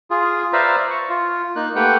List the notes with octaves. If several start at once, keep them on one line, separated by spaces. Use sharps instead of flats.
F4 G#4
B4 C5 D5 E5 F5 A#5
C#6
F4
A#3 D#4 F#6
A3 A#3 G4 B4 F#5 G5